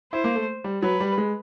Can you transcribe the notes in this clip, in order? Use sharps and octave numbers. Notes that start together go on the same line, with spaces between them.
E4 C5
A#3
A3
G3
F#3 B4
G3
G#3